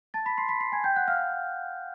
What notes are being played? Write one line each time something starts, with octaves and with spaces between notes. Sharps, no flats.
A5 A6
B5 B6
C6 C7
B5 B6
C6 C7
G#5 G#6
G5 G6
F#5 F#6
F5 F6